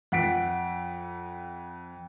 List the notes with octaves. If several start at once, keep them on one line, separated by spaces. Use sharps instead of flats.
F2 F#5 B6 D7